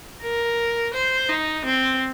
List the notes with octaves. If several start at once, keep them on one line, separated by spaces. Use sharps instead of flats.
A#4
C5
D#4
C4